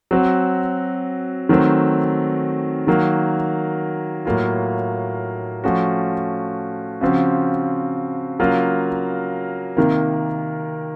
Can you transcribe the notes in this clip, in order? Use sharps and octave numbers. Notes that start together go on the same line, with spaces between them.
F#3 C4 F#4
D#3 F#3 A3 C4
D#3 F#3 A#3
A2 F#3 A#3 F4
F3 A3 C#4 F#4
C#3 F3 C4 F#4
C#3 F#3 A#3 F4
C3 D#3 A#3